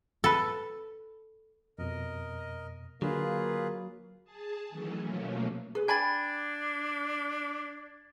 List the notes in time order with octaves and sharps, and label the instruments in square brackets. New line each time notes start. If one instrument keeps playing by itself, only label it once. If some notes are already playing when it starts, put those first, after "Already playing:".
[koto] A4 B4
[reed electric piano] F2 B2 [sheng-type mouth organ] A#4 D#5
[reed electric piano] D3 [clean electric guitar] F#3 [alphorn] A#3 [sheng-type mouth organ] F4 G#4 B4
[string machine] G#4 A5
D#3 E3 F#3 A3 C#4
B2 F3 F#3 A3 A#3 C#4
[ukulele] G#4 B4
[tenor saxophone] D4 [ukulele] G5 G#5 B5 [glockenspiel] G#6 A6